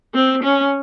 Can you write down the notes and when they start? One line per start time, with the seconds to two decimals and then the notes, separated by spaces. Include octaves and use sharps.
0.15 C4
0.44 C#4